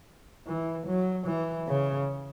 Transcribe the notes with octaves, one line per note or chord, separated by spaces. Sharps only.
E3
F#3
E3
C#3